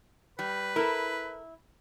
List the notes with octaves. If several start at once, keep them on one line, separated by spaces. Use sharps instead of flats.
G3 B4
E4 A4 A#4